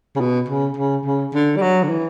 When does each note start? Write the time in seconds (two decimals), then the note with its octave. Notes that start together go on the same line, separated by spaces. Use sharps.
0.16 C#3
0.20 B2
0.48 C#3
0.77 C#3
1.05 C#3
1.34 D3
1.56 G3
1.61 F#3
1.84 D3
1.89 E3